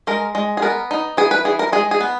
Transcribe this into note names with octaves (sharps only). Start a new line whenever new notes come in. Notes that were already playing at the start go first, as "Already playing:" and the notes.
G#3 A#4
G#3
G#4
B3 A#4
D#4
E3 G#4
B4
E3 G#4
A#4
G#3 G#4
G#4
B3